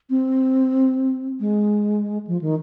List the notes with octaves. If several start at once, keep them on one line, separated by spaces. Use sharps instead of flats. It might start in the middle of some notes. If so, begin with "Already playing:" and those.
C4
G#3
F3
D#3